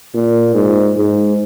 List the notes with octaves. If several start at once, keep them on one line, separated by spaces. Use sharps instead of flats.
A#2
G#2
G#2